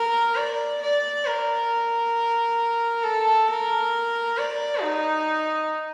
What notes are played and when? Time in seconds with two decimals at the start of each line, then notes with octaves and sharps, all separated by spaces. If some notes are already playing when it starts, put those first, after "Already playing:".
Already playing: A#4
0.37 D5
0.82 D5
1.26 A#4
3.04 A4
3.49 A#4
4.38 D5
4.82 D#4